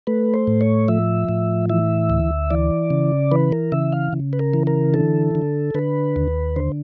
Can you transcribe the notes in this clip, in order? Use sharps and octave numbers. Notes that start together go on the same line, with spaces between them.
A3 B4
C5
A2
C#5
F3 E5
A2
E3 E5
D2
E3 D5
C#3
E3 B4
A#4
C#3 E5
F5
C#3
B4
A#4
E3
A#4
D3 A4
D3
D3 B4
D#2
D3 C5